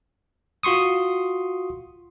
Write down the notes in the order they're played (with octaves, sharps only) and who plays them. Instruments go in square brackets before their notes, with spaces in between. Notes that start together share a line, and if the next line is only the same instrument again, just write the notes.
[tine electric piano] F4 F#4 C6 C#6 D#6